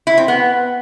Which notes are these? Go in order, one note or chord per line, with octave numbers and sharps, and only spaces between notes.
E4
C4
B3